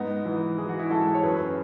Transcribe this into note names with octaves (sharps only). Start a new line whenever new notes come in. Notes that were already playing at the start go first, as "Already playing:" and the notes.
Already playing: G#2 B3 D#4
E3
E3 G#4
F#4
E4 G#4
G#2 F#4 A4
C#5
F#2 G#4 B4